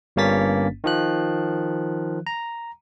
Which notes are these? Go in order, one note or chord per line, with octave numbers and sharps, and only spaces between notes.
G1 G2 A#3 C#4 A6 B6
D#3 F3 F#6
A#5